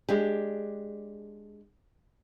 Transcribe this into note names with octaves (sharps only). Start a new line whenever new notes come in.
G#3 D4 G4